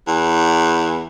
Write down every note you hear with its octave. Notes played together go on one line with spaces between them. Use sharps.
E2